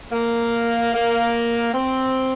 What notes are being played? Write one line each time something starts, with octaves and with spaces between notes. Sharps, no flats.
A#3
A#3
C4